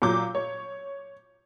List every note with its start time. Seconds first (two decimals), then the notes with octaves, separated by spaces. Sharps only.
0.02 A#2 F#3 D6 G6
0.35 C#5